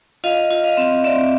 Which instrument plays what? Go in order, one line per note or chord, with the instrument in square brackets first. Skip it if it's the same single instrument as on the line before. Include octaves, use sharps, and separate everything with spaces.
[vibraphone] F4 D#5 F5
F4
D#5 F5
C4
C4 D5 E5